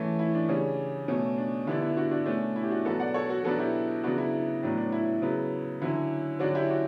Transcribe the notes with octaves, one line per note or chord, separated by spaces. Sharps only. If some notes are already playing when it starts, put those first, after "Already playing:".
Already playing: E3 A3 C#4
E4
D4
C#3 G3 C#4 D4
B2 A3 C#4
D4
D3 G3 B3 D4 E4
E4
D4 F#4
D4 F#4
B2 A3 C#4 D4
E4
G4
D4 F#4
B2 F#3 B3 F#4 A4
D5 F#5
A4 C#5
F#4 A4
B2 F#3 B3 D4 F#4 A4
E4 G4
C#3 F#3 B3 D4 F#4
E4
E4
A2 F#3 B3 D4
D4
E4
C#3 F#3 B3
D3 F#3 C#4 E4
D3 F#3 C#4 D4 F#4
E4 G4
D4 F#4